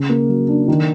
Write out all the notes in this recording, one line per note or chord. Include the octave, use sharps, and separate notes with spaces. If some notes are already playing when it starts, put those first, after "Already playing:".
Already playing: C#3
A#3
F#3
D4
D#3